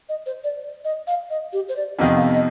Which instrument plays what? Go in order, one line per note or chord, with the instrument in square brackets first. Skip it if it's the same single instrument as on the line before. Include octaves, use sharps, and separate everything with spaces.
[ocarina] D#5
C5
D5
D#5
F5
D#5
G4
C5
D5
[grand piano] F2 C3 D#3 B3 D#4 [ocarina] D#5
[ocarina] F5
D#5